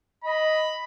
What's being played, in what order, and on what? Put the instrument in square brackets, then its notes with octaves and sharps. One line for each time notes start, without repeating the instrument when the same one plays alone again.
[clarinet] D#5 [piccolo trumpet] B5